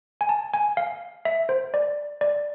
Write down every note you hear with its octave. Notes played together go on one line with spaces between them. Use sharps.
G#5
A5
G#5
F5
E5
C5
D5
D5